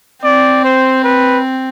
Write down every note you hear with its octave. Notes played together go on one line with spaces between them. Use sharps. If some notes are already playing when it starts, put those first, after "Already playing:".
C4 D5
C5
B4